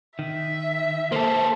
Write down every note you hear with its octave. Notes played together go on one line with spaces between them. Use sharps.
D#3 E5
A#3 A4 C5